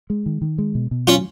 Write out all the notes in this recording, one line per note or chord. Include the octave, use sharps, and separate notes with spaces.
G#3
D#3
D#3
G#3
B2
B2
F#3 C#4 F4